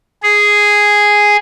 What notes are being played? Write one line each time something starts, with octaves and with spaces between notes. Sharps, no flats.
G#4